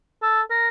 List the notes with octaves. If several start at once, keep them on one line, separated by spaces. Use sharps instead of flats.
A4
A#4